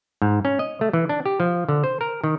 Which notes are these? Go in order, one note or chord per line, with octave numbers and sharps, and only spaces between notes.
G#2
C#4
D#5
A3
E3
D4
G4
F3
D3
C5
A#4
D#3